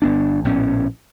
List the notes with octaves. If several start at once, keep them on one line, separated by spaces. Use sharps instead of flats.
G1 B3 D4
A#1 A2 B3 C#4